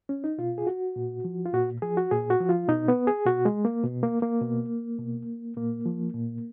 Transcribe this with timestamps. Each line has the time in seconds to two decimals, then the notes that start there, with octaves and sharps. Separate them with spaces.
0.09 C#4
0.24 D#4
0.38 B2 F4
0.58 G#4
0.67 F#4
0.96 A#2
1.25 F3
1.45 F4
1.54 A#2 F#4
1.82 F3 G#4
1.97 F#4
2.11 A#2 G#4
2.30 F#4
2.40 F3
2.49 F4
2.68 B2 D#4
2.88 B3
3.07 G#4
3.26 B2 F#4
3.45 G#3
3.65 A#3
3.84 B2
4.03 A#3
4.22 A#3
4.41 B2
4.98 B2
5.56 A#2 A#3
5.86 F3
6.14 A#2